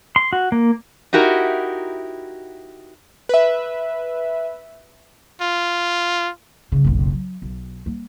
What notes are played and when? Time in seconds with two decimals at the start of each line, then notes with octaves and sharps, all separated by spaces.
0.16 C6
0.33 F#4
0.52 A#3
1.13 D#4 E4 F#4 G4 A#4
3.29 B4 E5
5.41 F4
6.72 C#3 G3
6.84 F#1 B1
7.13 F#3
7.42 B1
7.86 G3 A#3